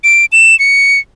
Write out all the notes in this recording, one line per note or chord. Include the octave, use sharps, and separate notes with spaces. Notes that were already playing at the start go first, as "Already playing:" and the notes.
D7
E7
C#7